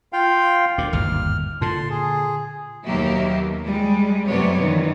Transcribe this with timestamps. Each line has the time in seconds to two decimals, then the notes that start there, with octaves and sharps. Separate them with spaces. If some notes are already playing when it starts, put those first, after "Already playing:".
0.13 F4 F5 G5
0.78 D2 A#2 D6
0.93 G1 D#2 G#2 F6
1.61 A#2 D3 A5 C6
1.90 G#4
2.85 D#2 B2 F#3 A#3 G4 E5
3.66 G3 G#3
4.27 F#2 C3 A3 B3 C#5 D5
4.59 D#3 E3